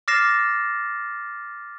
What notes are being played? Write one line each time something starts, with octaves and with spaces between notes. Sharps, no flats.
D6 F6 A6 A#6 C7 E7